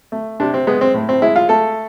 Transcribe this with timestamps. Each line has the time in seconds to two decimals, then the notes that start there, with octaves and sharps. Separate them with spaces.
0.12 A3
0.40 C3 D4
0.54 C4
0.67 G#3 B3
0.81 C4
0.94 A2
1.09 C4
1.22 G#3 E4
1.36 F4
1.49 A3 A4